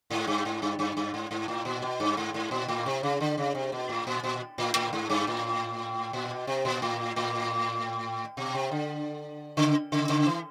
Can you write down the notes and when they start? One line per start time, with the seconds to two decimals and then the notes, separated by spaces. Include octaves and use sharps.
0.10 G#2
0.27 G2
0.45 G#2
0.62 G2
0.79 G2
0.97 G2
1.14 G#2
1.31 G#2
1.48 A2
1.65 A#2
1.82 B2
2.00 G2
2.17 G#2
2.34 G#2
2.51 A#2
2.68 A2
2.86 C3
3.03 C#3
3.20 D3
3.38 C#3
3.55 C3
3.72 B2
3.89 A2
4.07 A#2
4.23 A#2
4.58 A2
4.75 A2
4.93 G#2
5.09 G2
5.27 A2
6.13 A#2
6.30 B2
6.47 C3
6.65 A#2
6.82 A2
7.16 A2
8.37 B2
8.55 C3
8.71 D3
9.57 C#3
9.92 C#3
10.09 C#3
10.26 E3